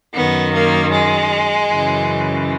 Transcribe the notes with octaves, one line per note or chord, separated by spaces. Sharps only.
F#2 D#3 B3
A#3
G#3
F#2 C#3 E3